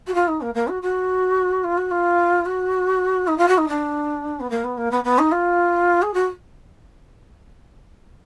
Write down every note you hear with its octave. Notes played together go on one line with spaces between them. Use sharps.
F#4
F4
D#4
A#3
A#3
F#4
F#4
F4
F#4
F4
F#4
D#4
F4
F#4
D#4
D4
B3
A#3
B3
A#3
B3
B3
D#4
F4
G#4
F#4